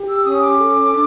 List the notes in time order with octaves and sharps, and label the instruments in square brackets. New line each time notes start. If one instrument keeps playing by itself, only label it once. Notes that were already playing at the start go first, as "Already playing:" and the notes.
Already playing: [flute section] G4
E6
C#4 D#6
D6
A4
D4